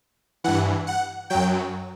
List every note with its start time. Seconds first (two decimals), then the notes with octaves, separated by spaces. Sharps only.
0.44 G2 E3 F#5
0.87 F#5
1.30 F#2 F#3 G5